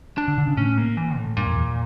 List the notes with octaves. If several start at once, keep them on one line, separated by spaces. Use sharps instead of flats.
D4
D3
D3
C#3
A2 C#4
A#3
E3
A2
G2 A#2
F2
E2